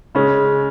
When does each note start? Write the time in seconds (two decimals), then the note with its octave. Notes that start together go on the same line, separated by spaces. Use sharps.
0.15 C#3 G#3 C#4